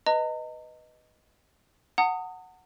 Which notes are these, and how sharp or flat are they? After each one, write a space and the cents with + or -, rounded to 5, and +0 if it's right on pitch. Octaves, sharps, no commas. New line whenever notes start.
B4 +0 D#5 +0 A#5 -40
F#5 +0 A#5 -45 D#6 +0